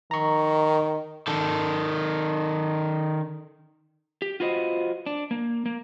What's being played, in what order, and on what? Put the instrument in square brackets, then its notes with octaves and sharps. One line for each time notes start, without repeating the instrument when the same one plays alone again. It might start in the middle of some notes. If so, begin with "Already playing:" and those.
[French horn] D#3 [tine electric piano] A#5 C#6
[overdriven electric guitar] D#3 A4
[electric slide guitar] G4
F4 F#4 B4 C5 D#5
D4
A#3
A#3